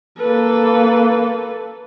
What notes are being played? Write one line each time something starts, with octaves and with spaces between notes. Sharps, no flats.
A#3 A4 B4